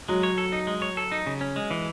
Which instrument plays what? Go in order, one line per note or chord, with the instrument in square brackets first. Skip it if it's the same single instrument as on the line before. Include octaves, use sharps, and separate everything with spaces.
[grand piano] F#3 [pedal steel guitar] G#3
[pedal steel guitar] C#5
A4
D#4
G#3
C#5
A4
D#4
C#3
C#4
G#3
E3